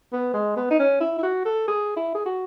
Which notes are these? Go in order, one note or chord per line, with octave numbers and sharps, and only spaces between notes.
B3
G#3
B3
D#4
C#4
E4
E4
F#4
A4
G#4
E4
G#4
F#4